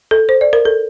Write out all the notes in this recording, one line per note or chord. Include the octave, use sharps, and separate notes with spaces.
A4
C5
D5
A#4
A4